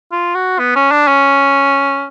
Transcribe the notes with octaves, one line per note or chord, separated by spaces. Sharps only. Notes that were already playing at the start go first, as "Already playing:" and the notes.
F4
F#4
B3
C#4
D4
C#4